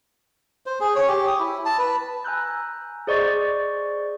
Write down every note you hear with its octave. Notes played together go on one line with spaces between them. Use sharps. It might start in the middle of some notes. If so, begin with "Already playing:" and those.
C5
G#4
C#5
G4
D#6
E4
A5
B4
G#5 A#5 E6 F#6 G6
G#4 C5 D5 D#5 C#6 A6